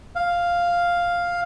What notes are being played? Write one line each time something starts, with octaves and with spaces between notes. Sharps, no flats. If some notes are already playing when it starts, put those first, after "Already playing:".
F5